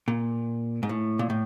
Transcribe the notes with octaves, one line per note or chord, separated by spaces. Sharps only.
A#2
G#2
A2
A#2
A2